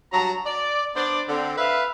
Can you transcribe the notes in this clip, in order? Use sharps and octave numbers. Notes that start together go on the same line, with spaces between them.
G2 F#3 A5 A#5
D5
B3 D4 C5 D5
D3 C4
B4 E5 F5